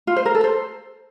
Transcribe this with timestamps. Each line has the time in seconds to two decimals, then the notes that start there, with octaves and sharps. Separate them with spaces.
0.07 F4
0.16 C5
0.26 A#4
0.35 A4
0.44 C5